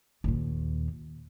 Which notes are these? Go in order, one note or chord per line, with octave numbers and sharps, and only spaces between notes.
D#2 A#2